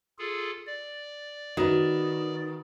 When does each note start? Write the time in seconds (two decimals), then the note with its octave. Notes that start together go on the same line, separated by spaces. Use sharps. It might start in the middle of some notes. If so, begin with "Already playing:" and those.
0.19 F4 G#4 A4
0.67 D5
1.57 D#3 F#4 B4